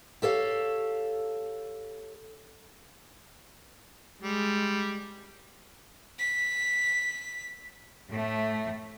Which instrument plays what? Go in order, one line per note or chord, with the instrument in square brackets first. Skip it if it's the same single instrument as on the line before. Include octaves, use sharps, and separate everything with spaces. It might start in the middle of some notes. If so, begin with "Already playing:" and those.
[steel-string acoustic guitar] G4 A4 C#5 F5
[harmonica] G3 [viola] G#3
[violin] B6
[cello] A2 A3